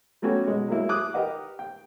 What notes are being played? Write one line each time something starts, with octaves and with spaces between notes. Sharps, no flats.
F#3 A3 B3 C#4 F#4 G4
B2 G#3
F#3 G#3 A#3 E4
D6 D#6 F#6
G4 A#4 B4 D#5 F#5
G5